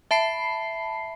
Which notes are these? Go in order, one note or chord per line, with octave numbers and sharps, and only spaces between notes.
E5 A5 B5 C7